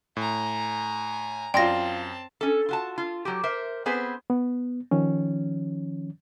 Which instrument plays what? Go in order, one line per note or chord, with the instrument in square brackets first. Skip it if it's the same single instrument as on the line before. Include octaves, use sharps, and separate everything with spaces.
[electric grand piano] A2 [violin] G#5 A#5
[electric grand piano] F#2 C6 [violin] C4 A5 [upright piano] F4 D5 [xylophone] G5 A#6
[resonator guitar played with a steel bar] C#4 A4
F4 F#4 A5
F4
F#3 F#4 G4
A#4 C5 E5
B3 C4 G#4 B4 C5
[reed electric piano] B3
D#3 F3 C#4